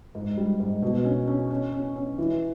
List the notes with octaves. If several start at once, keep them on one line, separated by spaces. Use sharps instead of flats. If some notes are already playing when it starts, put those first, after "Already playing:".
G#2
G3
G#2
B2
C#4
C#4
C#4
C#4
C#4
E3